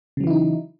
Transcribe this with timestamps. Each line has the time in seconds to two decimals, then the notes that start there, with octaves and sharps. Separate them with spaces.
0.17 C#3
0.20 F#3
0.24 E3
0.27 E4
0.30 D#4